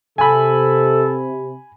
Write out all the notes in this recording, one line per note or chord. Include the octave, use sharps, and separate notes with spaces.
C3 A4 G#5 B5